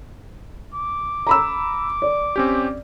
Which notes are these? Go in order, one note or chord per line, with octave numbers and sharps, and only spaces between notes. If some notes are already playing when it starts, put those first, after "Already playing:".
D6
A#5 B5 E6
D5
C4 C#4 G4